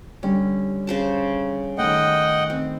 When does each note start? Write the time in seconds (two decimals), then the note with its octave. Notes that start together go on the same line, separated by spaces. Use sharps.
0.23 D3 G3 C#4
0.87 C#3 C5 A5
1.78 A2 D#3 D#5 F#5 G5
2.50 C4